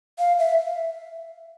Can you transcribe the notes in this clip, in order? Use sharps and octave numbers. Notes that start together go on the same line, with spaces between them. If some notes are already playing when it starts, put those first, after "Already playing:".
F5
E5